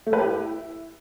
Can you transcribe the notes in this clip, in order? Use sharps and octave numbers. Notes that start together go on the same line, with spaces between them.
A3
B4
G4
E4